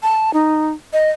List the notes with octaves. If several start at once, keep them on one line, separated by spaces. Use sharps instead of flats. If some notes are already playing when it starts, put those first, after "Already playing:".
A5
D#4
D#5